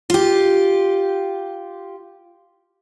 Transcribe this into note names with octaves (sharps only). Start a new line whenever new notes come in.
F4 G4